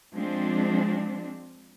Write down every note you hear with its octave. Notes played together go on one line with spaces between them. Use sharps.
F3 G#3 C4 D4